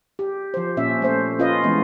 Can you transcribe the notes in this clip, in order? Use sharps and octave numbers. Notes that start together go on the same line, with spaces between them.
G4
F3 C5
A#2 C#4 E5
A3 C5
C#4 F4 B4 D#5
E3 G#3 A3 B3